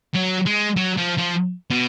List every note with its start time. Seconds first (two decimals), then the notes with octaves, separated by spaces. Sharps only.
0.15 F#3
0.46 G#3
0.77 F#3
0.98 F3
1.18 F3
1.70 B2